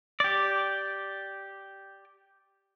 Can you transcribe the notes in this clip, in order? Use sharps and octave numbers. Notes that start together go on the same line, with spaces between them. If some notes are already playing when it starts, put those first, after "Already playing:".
G4 D5